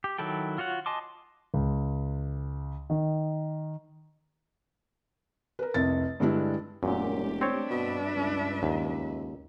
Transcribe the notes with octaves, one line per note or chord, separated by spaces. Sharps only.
G4
D#3 F#3 E4 A4 G5
F4 F#4 C#5 F#5
D#5 G#5 A5 C6 D6
C#2
D#3
A#4 B4
F1 C2 A6
G2 D3 G3 G#3 D4 E4
E1 F#2 A#2 G#3 A3 G4
C4 D4 C#5
G2 B2 B4 E5
C#2
D#2